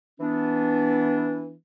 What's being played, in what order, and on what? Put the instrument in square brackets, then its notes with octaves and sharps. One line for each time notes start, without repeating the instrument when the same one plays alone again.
[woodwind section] E3 B3 D4